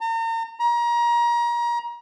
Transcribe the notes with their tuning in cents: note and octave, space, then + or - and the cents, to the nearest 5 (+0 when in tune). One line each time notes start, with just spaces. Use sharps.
A#5 -40
A#5 +30